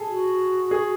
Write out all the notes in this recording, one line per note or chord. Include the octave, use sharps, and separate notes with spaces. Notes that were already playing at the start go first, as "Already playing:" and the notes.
Already playing: G#4 A4
F#4
G#4